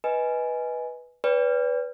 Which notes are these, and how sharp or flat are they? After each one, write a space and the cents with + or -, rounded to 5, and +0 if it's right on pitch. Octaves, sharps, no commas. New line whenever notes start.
B4 -5 D#5 +15 G#5 +5
B4 +0 D5 -45 G5 +30